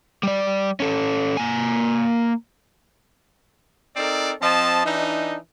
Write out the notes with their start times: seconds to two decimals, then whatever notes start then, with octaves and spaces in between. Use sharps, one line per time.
0.23 G3 D5
0.80 C#4 A4
1.37 A#3 G#5
3.96 C4 D#4 A4 A#4 D5
4.41 F3 C4 D#5 A5
4.86 E3 D4 D#4